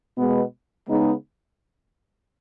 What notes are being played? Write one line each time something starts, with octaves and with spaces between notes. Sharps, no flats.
B2 G#3 B3
C#3 G#3 B3 D#4